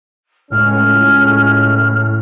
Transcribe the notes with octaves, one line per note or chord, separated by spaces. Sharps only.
C#2 A2 C#4 F6